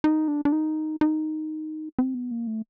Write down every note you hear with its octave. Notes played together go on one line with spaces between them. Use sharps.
D#4
D4
D4
D#4
D#4
C4
B3
A#3
A3